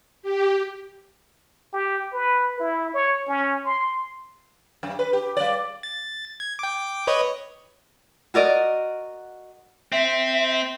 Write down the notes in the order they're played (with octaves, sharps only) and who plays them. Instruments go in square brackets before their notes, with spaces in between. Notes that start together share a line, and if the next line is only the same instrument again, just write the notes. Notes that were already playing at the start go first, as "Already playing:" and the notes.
[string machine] G4
[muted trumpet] G4
B4
E4
C#5
C#4
C6
[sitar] F#2
B4
G4
G3 D5
[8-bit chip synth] A6
G#6
G5 D6
B4 C#5 D#5
[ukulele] F#4 A#4 D5 D#5
[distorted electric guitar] C4 [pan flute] E5